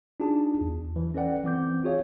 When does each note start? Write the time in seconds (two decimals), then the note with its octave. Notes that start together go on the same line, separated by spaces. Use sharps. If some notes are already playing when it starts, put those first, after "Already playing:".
0.20 D4 D#4 F4 F#4 G#4 A5
0.61 E2
0.96 E3
1.14 C#4 A4 B4 D5 F#5 G5
1.44 E3 C4 D6 G6
1.84 F4 F#4 G#4 C#5 E5 F5